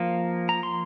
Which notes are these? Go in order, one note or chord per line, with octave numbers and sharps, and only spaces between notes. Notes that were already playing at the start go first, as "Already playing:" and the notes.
Already playing: F3 A#3
A#5
C6